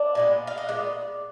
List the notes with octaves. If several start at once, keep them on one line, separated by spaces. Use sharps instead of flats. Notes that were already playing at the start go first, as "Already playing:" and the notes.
Already playing: D4 D5
A#2 G#3 B3
F5
D#5
A#2 G#3 B3 D5